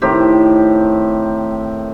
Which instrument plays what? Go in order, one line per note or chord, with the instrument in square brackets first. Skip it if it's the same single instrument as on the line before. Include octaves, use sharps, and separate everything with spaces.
[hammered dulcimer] A2 D#3 C4 G4